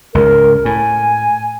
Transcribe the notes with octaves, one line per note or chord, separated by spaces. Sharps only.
C#2 G#2 A#4
A2 G#5